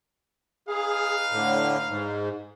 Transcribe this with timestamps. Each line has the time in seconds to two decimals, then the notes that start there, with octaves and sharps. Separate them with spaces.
0.68 D#4 G#4 B4 F5
1.32 A2 D3
1.88 G#2